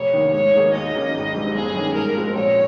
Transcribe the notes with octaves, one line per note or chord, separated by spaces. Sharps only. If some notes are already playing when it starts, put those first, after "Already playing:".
Already playing: F1 C#5
D#2 D#3
G#2 C#5
D#3 A#3 D#4 G#4
D#2 D#5
D#3 A#3 C#4 G#4
G#1
G#2 G3 C4 G4
G1 G#4
G2 D#3 G3 C#4
G#2 A#4
F3 G#3 C4
A#1 C#5